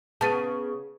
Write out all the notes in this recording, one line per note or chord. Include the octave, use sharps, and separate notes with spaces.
C#3 B3 A5 A6 D#7